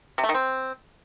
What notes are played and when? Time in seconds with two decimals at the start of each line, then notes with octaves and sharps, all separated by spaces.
0.18 C3
0.24 A3
0.29 D#3
0.34 C4